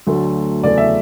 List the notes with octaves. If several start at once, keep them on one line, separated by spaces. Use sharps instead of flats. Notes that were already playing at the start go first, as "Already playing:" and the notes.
D2 D3 F#3 A3
E2 C#3 F#3 A3 D5
E5